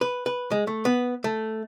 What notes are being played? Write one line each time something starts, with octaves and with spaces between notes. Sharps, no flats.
B4
B4
G#3
A3
B3
A3